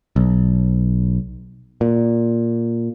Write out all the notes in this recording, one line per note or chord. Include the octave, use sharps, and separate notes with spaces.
B1
A#2